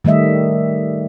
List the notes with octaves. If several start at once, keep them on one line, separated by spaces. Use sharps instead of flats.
D#3 G3 A3 D#5 E5